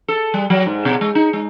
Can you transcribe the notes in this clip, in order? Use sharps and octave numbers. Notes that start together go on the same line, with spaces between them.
A4
G3
F#3
G#2
B2
G#3
D#4
G#3